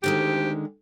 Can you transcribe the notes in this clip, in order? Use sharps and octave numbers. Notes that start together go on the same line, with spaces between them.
D2 D3 D#3 G#3 C4 G4